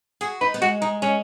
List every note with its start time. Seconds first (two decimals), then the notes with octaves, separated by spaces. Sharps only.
0.21 F#4 G#4
0.41 D#4 B4
0.54 B3
0.61 G#3 F#4
0.81 G#3 D#4
1.02 G#3 C#4